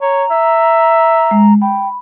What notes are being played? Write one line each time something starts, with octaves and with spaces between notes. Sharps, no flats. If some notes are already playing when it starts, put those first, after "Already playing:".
C#5 A#5
E5
G#3
G5 B5